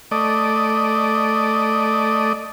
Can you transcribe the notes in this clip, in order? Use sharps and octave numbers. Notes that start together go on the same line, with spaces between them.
A3 D5 D#5